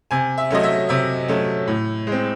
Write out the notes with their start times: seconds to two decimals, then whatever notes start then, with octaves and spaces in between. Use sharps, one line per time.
0.11 C3 G#5
0.38 E5
0.51 F#3 A3 C#4 D#5
0.63 E5
0.89 C3 E5
1.28 F#3 A3 C#4
1.67 A2
2.07 G#3
2.12 C4